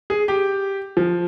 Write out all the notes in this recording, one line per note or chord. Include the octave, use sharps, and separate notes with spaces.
G#4
G4
F3